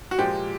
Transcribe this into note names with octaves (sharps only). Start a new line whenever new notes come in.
F#4
A#2 F3 G#3 G4